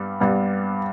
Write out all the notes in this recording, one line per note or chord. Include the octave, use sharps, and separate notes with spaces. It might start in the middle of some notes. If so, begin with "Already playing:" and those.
Already playing: G2 G3 B3
G2 G3 B3